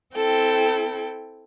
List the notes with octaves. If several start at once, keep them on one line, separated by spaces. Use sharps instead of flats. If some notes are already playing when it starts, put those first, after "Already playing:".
C4 E4 A4 G5